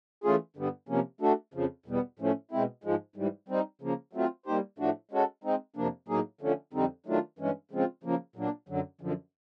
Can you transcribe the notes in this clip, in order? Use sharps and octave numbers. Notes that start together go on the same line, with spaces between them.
E3 A3 C#4 F4 G#4
G2 D3 G3 B3
C3 F3 A#3 C#4
A3 D4 F#4 A4
F2 C#3 F3
E2 B2 G3 B3
A2 F3 A3 C#4
B2 G#3 C4 E4
G#2 F3 G#3
G#2 E3 G3
G3 C4 D#4
C#3 F3 A#3
F#3 A3 C4 F4
G3 A#3 D#4 G4 C5
A2 F3 A3 D4 F#4
G#3 C#4 F#4 A4
G#3 C4 D#4
F2 C3 F3 A#3 D4
A2 F#3 A#3 D#4 G#4
D3 F3 A3 C#4
F2 D3 G3 C4 D#4
D#3 F#3 A3 D4 F4
G2 E3 G#3 C#4
C#3 F3 G#3 C4 F4
C#3 F3 A#3
A#2 F#3 A#3 D4
F#2 D3 F#3
F#2 D3 F3